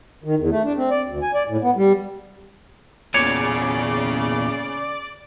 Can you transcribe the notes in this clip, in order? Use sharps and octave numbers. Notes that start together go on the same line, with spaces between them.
D#3
E2
A3
D4
C4
D5
D2
G#5
D5
A2
B3
G3
E2 A#2 C#3 C#5 D5